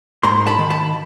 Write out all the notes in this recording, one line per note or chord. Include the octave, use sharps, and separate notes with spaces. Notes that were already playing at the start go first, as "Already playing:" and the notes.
G#2 A#5 C6
A5 B5
D#3
A5 B5